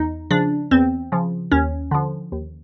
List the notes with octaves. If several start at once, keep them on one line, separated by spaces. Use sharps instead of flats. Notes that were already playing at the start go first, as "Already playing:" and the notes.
Already playing: E2 D#4
C#3 F3 D4
E2 C4
C#3 F3
D#2 C#4
D3 F3
D#2